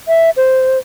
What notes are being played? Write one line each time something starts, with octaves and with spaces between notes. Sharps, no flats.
E5
C5